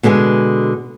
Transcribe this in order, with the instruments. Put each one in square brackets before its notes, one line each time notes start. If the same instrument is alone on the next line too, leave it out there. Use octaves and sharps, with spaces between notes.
[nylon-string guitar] B2 D3 G#3 G5 G#5